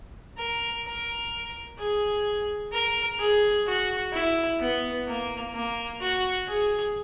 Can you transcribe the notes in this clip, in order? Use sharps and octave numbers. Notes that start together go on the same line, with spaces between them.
A#4
A#4
G#4
A#4
G#4
F#4
E4
B3
A#3
A#3
F#4
G#4